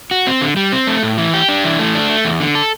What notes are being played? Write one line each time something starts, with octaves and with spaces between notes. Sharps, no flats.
F#4
C4
D3
G3
C4
A3
A2
E3
G4
D4
E3
A3
D4
A3
E2
D3
A4